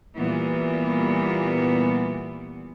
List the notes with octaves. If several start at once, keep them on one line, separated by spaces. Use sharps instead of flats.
A#2 E3 G3 B3